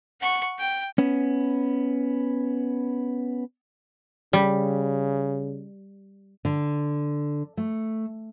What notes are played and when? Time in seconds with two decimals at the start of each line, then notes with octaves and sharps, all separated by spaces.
0.20 F#5 C#6
0.58 G5
0.98 B3 C#4
4.33 C#3 G3
6.45 D3
7.57 A3